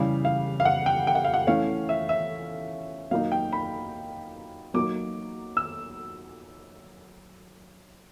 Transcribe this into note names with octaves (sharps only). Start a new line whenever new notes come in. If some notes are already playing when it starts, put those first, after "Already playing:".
Already playing: C#3 E3 G3 F5
F5
F5
F#5
G5
G5
F#5
F5
F#5
E3 A3 C#4 F5
E5
E5
F#3 A#3 D#4 F5
G5
B5
F#3 A#3 D#4 D6
E6